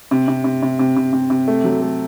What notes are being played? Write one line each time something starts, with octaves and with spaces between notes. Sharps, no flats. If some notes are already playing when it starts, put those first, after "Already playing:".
C3
C3
C3
C3
C3
C3
C3
C3
A3
F#3
A3